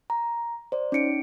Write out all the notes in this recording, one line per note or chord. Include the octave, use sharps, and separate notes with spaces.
A#5
C5 D5
C#4 D#4 C#7 D7